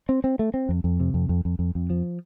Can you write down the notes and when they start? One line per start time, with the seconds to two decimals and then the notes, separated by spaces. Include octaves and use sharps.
0.09 C4
0.24 C4
0.39 A3
0.54 C4
0.69 F2
0.84 F2
1.00 C3
1.14 F2
1.29 F2
1.45 F2
1.59 F2
1.75 F2
1.90 F3